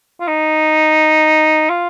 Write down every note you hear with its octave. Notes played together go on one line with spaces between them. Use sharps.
F4
D#4
F4